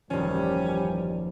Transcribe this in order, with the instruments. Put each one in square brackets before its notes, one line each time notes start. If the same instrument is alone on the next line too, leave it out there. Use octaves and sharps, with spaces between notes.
[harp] D#1 F3 [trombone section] F#2 E3 G3 [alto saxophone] C#4